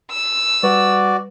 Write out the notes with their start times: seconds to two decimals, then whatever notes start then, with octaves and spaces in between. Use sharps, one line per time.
0.12 E6
0.63 G3 F#4 B4 D5